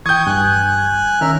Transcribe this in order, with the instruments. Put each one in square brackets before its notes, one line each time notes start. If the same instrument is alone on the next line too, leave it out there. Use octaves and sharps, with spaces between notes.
[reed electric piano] E3 G5 [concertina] C#6 D#6 [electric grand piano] G6 G#6
[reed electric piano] G2 [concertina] G#5 F#6
[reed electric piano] D#3 C#4 [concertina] A#4 E5 F6